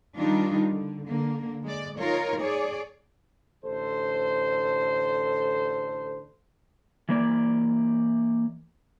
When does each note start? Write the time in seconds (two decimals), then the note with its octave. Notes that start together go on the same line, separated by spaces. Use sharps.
0.17 D#3 G3 D4 D#4 F4
0.71 D3
1.05 D3 A#3
1.64 G#3 D5
1.99 D#4 F4 A#4 C#5
2.40 G#4 C#5 D5
3.64 A1 D3 A4 C5
7.09 E3 A#3 D5